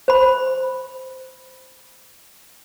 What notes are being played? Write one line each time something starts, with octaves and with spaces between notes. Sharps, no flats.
C5 B5